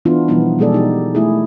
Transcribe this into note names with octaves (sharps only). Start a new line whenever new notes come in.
E3 B3 D4 E4 F4
B2 E3 F3 G3 B3 D#4
B2 G#3 G#4 A4 D5
B2 D#4 G4
A3 E4 G#4